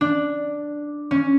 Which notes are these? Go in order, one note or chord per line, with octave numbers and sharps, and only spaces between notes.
D4
C#4